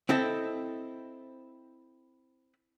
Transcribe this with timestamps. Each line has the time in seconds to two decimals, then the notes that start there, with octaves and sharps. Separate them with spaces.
0.09 C4 E4 A4 D#5